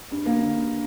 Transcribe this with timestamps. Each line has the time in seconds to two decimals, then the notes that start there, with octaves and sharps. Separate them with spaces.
0.11 G2
0.26 A#3
0.40 D3